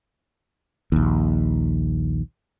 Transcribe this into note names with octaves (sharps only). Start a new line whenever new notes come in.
A#1 D#2